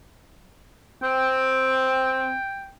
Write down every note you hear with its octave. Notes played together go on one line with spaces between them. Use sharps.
C4 G5